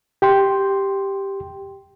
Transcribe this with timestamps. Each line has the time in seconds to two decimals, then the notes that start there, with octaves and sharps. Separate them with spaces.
0.22 G4 G5 C6